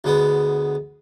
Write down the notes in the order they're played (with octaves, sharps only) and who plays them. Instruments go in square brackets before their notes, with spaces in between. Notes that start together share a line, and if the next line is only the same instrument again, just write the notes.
[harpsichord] D2 G#3 B3